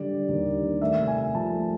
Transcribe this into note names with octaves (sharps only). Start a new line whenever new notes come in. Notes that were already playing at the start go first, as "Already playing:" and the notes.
Already playing: D3 G3 D5
G3
D#2
D3
A#3
A3 E5
C3
G#5
C3
F3 A5
A3